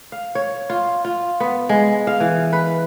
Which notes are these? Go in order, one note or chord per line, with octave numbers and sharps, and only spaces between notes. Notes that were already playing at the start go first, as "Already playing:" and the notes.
F5
C#5
F4
F4
B3
G#3
F5
E3
B4